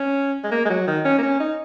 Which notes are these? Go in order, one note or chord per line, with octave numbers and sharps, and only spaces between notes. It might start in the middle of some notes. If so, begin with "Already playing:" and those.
Already playing: C#4
G#3
A#3
G#3
F#3
D#3
C#4
A#3
C#4
D#4